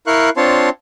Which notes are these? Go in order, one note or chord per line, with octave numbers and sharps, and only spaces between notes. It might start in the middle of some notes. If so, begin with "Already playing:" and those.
E4 A#4 F5 C#6 F#6
C4 D4 F4 C#5 A5 C6